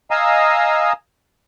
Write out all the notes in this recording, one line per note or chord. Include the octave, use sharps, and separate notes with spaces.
D#5 F5 G#5 A#5 D#6 E6